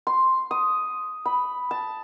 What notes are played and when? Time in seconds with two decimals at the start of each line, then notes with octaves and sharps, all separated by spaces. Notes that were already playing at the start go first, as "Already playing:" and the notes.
0.07 C6
0.51 D#6
1.25 B5
1.71 A5